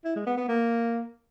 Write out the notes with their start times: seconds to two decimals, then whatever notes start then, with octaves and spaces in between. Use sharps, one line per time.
0.05 E4
0.16 G#3
0.27 B3
0.37 B3
0.48 A#3